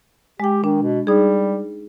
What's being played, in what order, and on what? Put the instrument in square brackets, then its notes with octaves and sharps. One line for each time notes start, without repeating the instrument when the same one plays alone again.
[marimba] G#3 G5 [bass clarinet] G4
[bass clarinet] D#3 [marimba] D4
[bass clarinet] B2
[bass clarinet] G3 [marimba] D#4 G#4